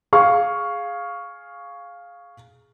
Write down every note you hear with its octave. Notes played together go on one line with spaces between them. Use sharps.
G#4 F5 C#6